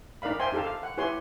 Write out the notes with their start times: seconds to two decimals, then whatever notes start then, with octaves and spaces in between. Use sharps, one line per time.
0.22 D#4 A#4 D5 F5 B5
0.40 C5 E5 G5 G#5 C6
0.52 D#4 G4 A4 F5 A5
0.64 F5
0.83 F#5
0.97 E4 G4 B4 C#5 G#5 C6